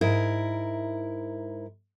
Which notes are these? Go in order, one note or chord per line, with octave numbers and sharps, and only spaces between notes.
G#2 E4 A#4